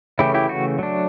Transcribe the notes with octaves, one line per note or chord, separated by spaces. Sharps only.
C#3 E3 A3 C#4 E4 G4
E4 G4
F#4
F#3 A3 D4